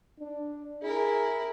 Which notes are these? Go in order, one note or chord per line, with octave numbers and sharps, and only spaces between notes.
D4
E4 G#4 A#4